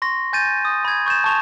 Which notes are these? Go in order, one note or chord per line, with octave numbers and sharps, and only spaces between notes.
C6 C#6 A#6
G#5 G6 A6 D#7
D#6
B5 G#6
C#6 G6 A6 E7
A5 C#6 F7